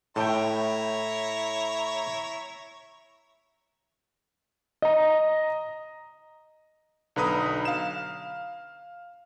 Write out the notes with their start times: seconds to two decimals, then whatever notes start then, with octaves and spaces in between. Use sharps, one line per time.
0.16 A2 A3 E4 C#5 G5 A#5
4.82 D#5 A#5
7.16 B1 D3 B4 A#5 B5 D#6
7.65 F5 E7